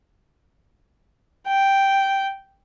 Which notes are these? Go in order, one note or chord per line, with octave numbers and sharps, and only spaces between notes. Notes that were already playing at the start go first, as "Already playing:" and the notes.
G5